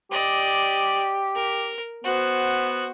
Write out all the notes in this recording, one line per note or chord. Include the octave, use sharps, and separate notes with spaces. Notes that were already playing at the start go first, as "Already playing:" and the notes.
G4 D5 D#5
A#4
B3 F#4 C5